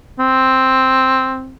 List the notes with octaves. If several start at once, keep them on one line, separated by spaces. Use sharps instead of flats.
C4